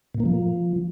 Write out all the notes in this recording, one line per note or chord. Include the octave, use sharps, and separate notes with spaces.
A#2
A#3
F3